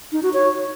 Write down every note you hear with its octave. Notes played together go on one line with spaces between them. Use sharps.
D#4
F#4
C#5